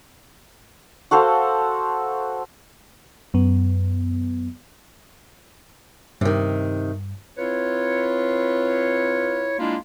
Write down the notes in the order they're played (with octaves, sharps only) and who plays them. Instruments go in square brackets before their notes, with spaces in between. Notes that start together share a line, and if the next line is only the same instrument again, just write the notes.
[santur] F#4 A4 C5 F5
[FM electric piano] F#2 B3
[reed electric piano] G2 [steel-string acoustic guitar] C3 D#3
[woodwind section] C4 E4 F4 B4 C#5
G#3 A#3 D4 E4 F4